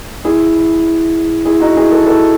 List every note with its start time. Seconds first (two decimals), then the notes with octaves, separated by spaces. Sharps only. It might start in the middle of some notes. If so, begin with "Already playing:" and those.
0.25 E4 G#4
1.45 E4 G#4
1.60 D#4 F#4
1.77 E4 G#4
1.92 F#4 A4
2.06 F#4 A4